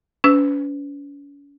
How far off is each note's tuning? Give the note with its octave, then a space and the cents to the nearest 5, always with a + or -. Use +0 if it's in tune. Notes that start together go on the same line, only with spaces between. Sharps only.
C#4 +45 B4 +30 E6 +0